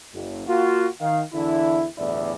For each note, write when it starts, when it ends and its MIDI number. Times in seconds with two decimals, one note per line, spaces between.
0.13 0.43 30
0.47 0.86 58
0.47 0.86 65
0.47 0.86 66
1.01 1.21 51
1.01 1.21 77
1.33 1.85 40
1.33 1.85 50
1.33 1.85 52
1.33 1.85 62
1.33 1.85 64
1.97 2.34 31
1.97 2.34 40
1.97 2.34 45
1.97 2.34 64
1.97 2.34 74